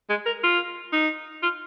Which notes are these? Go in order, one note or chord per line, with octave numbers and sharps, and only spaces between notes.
G#3
A#4
F4
D#4
F4